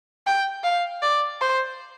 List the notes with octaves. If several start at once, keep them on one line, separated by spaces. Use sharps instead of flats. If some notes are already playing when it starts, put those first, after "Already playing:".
G5
F5
D5
C5